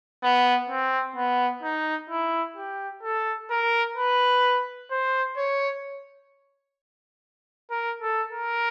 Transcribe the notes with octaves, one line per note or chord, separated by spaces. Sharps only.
B3
C4
B3
D#4
E4
G4
A4
A#4
B4
C5
C#5
A#4
A4
A#4